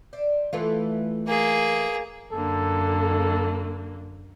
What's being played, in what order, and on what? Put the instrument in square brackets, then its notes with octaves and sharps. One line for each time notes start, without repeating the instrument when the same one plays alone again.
[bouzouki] C5 D5 E5
[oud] E3 A3 F4 [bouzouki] G4 B4
[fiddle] A#3 G#4
[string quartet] F#2 D3 A#3 [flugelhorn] A4